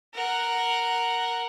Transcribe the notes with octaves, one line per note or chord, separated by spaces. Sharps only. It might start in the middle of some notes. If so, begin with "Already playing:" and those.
A#4 F#5